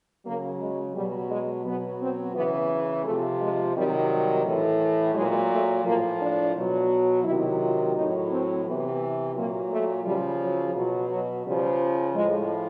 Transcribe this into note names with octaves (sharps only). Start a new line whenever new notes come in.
C#3 F#3 A#3
G#3
B2 F#3 G3
G#3
B2 F#3 B3
C4
C#3 E3 B3
C3 F3 A3
G#3
C3 D#3 F#3 G3
G3
A2 E3
A#2 F#3 G#3
A3
A2 F3 A#3
D4
B2 F#3
C3 D#3 F#3 E4
F4
A2 F#3 D#4
C4
C3 E3 B3
A#2 F#3 A#3
A3
C#3 F3 G3
F#3
B2 F#3
F#3
C#3 F3 G3
A2 F3 G#3